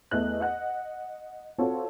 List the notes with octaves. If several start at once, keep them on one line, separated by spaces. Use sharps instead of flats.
E2 A3 D#5 F#6
D#5 F#5 F#6
C4 F4 F#4 A4 C#5